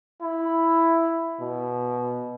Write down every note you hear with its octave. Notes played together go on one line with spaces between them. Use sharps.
E4
B2